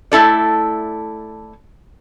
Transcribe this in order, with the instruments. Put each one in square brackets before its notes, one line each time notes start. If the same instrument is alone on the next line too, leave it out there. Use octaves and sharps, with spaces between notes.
[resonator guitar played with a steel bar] A3 E4 A4 D5